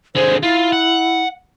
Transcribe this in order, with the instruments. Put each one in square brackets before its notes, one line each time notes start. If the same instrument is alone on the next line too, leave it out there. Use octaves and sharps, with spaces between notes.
[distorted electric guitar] D3 G#4 [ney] C5
[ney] E4 [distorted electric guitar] F4
[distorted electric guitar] F#5